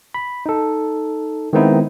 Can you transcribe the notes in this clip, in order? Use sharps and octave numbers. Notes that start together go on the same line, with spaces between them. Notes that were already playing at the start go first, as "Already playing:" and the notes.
B5
D#4 A4
D#3 G#3 B3 C4 D#4 E4